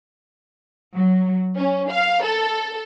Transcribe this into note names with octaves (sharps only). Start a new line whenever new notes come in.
F#3
C#4
F5
A4